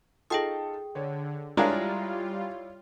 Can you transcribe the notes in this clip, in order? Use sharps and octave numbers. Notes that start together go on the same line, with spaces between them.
D#4 F4 G#4 A4 G5 D#6
D3 C#5
G3 G#3 D4 E4 F4 A#4 C#5 F5